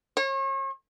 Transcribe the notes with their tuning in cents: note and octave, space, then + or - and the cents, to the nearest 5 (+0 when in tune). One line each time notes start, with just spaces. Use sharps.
C#5 -40